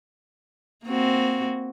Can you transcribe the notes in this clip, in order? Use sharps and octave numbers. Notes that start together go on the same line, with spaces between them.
A#3 C4 F#4